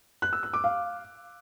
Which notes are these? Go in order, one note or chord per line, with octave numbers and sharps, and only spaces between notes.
F#6
E6
E6
D6
F5